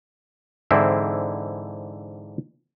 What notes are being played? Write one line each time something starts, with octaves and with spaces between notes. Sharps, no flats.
G#2 D3 E3 C4 E4